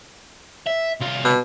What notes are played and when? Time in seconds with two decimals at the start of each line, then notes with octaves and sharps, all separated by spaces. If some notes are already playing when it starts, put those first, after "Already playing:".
0.66 E5
1.00 C2 F4
1.25 B2